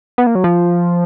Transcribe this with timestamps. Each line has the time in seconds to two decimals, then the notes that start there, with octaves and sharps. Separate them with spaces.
0.18 B3
0.27 A#3
0.35 F#3
0.44 F3